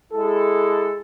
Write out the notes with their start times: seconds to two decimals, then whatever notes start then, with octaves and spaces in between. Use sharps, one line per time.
0.13 G#3 E4 A4